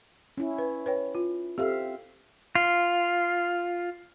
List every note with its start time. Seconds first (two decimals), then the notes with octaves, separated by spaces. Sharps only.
0.38 C#4 E4
0.58 B4
0.86 B4 C#5 G5
1.15 F4
1.58 C4 G4 A4 E5 F5
2.55 F4